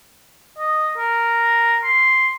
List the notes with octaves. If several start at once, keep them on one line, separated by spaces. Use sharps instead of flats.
D#5
A#4
C6